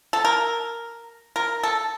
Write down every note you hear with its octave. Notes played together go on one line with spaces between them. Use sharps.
A4
A#4
A#4
A4